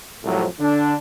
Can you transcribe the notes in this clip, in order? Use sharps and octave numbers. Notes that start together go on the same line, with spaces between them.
C2 F2 A2 F3 F#3
D3 D4